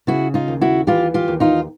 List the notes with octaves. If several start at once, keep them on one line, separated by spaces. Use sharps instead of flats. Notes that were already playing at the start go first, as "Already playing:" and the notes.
C#3 E4 F#4
D#4 F4
D#2
E4 F#4
E3 F4 G4
F4 G4
D#2
D#4 F4